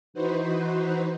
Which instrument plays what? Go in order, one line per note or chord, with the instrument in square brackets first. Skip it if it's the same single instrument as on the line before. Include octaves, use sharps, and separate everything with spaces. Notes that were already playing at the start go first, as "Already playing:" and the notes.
[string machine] E3 D#4 F#4 B4 C5